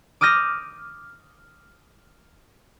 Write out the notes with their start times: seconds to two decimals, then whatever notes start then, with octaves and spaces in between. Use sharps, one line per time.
0.21 D6 D#6 F6 G6 A#6 D#7